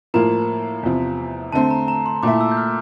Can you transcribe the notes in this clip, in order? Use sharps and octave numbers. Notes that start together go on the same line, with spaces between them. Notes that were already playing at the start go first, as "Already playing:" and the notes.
A2 F3 A#3 F4 A#5
E2 C3 F3
D3 A3 C4 A5
A#5
A#5
C6
A#2 A3 E4 D6
E6
G6
F6